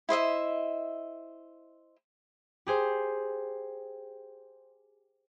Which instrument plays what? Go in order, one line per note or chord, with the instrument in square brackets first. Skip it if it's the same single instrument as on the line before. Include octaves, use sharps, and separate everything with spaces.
[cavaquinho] E4 C5 D#5 E5
[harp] G4 G#4 C5